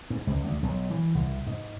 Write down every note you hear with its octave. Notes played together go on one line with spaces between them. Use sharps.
G#2
C#2
D2
B1
E3
C2
G#2